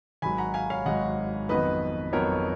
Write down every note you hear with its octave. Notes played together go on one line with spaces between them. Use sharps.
G#1 G#2 F#3 G#5 B5
F#5 A#5
F5 G#5
C#5 F5
G#1 G#2 F#3 D#5 F#5
F2 D#3 F#3 B3 B4 D#5
F2 D#3 F#3 B3 A#4 C#5